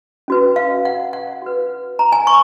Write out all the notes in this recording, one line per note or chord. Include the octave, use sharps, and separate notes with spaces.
C#4 F#4 B4
F5
F#5
F#5
F#4 B4
A#5
G#5
C#6